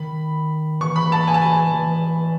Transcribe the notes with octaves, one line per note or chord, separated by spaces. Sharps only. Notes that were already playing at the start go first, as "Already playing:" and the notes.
Already playing: D#3 B5
E3 C#6
B5
A5
G#5
A5
G#5
E3